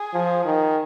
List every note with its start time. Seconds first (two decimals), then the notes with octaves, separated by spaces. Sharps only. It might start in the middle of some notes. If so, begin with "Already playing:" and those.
Already playing: G#4
0.14 F3
0.45 D#3